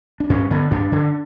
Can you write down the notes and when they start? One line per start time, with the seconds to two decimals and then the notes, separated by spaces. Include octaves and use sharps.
0.20 D4
0.30 G2 C#4
0.51 D3 B3
0.71 G2 D4
0.92 D3